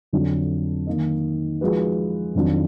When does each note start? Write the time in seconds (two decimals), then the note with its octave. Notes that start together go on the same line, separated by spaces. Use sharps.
0.13 F2 D3 F#3 D4
0.87 D#3 A#3 D#4
1.61 F3 G#3 D#4 F#4 B4
2.35 F2 D#3 F#3 D4